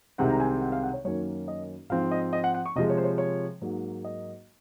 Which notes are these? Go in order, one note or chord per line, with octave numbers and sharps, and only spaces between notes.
C2 C3 D#3 G#3 C4 F#5
A#5
G#5
F#5
F5
F#5
C#5
F#2 D#3 F#3 A#3 C#4 C#5
D#5
G#2 F3 C4 F5
D#5
D#5
F#5
F#5
C#6
C3 F3 G#3 D#5
C#5
C5
C#5
C#5
G#2 F#3 A#3
D#5